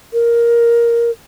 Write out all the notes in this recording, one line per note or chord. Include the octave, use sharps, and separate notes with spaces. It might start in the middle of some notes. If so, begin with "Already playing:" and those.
A#4